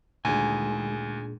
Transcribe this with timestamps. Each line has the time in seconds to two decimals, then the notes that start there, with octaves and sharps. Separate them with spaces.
0.25 D2 A#2 D#3 G#3 D4 G#4 G#5